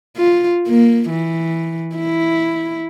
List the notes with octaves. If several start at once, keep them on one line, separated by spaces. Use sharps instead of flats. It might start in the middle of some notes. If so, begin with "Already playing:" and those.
F4
A#3
E3
E4